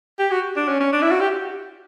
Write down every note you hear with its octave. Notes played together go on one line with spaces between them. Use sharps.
G4
F#4
D4
C#4
C#4
D4
E4
F#4
G4